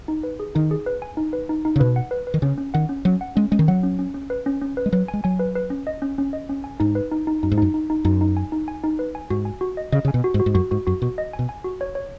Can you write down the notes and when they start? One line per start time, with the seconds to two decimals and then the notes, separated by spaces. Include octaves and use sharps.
0.08 D#4
0.23 B4
0.40 G#4
0.55 D#3 D#4
0.71 G#4
0.86 B4
1.02 G#5
1.17 D#4
1.33 B4
1.49 D#4
1.65 D#4
1.76 C#3
1.80 B2 B4
1.96 F#5
2.11 B4
2.27 B4
2.34 D#3
2.42 C#3 C#4
2.58 C#4
2.74 D#3 F#5
2.89 C#4
3.05 F#3 C#4
3.21 F#5
3.36 G#3 C#4
3.52 G#3 C#4
3.59 D#3
3.68 F#3 F#5
3.83 C#4
3.99 C#4
4.14 C#4
4.30 B4
4.46 C#4
4.62 C#4
4.77 B4
4.86 G#3
4.92 F#3 B4
5.08 G#5
5.13 G#3
5.24 F#3 G#5
5.39 B4
5.56 B4
5.70 C#4
5.87 D#5
6.02 C#4
6.18 C#4
6.33 D#5
6.49 C#4
6.64 G#5
6.80 G#2 D#4
6.95 B4
7.11 D#4
7.27 D#4
7.43 F#2 D#4
7.52 G#2
7.58 F#2 D#4
7.74 D#4
7.90 D#4
8.05 F#2 D#4
8.21 D#4
8.37 G#5
8.52 D#4
8.68 G#5
8.84 D#4
8.99 B4
9.15 G#5
9.30 G#2 F#4
9.45 G#5
9.61 F#4
9.77 D#5
9.92 C#3 D#5
10.05 C#3 G#5
10.14 B2
10.24 F#4
10.34 G#2
10.40 F#4
10.46 G#2
10.55 F#2 F#4
10.71 G#2 F#4
10.87 F#2 F#4
11.02 B2 F#4
11.18 D#5
11.33 G#5
11.39 B2
11.49 G#5
11.64 F#4
11.81 C#5
11.95 C#5